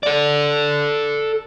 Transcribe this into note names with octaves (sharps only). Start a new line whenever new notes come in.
A4 D5